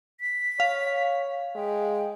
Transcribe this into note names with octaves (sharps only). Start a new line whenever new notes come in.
B6
C#5 F5
G#3 G5